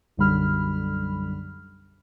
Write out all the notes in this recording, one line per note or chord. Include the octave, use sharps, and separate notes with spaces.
B1 F#2 D3 G3 B5 F6